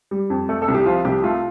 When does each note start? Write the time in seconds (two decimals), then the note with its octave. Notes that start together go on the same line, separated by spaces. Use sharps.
0.11 G3
0.30 F2
0.49 A3 A4
0.62 A4
0.68 C2
0.74 G4
0.86 F3 F4
1.05 C2 G4
1.23 A3 F4